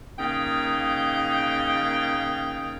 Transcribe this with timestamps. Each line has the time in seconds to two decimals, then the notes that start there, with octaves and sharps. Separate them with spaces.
0.18 C#3 A#3 D#4 G5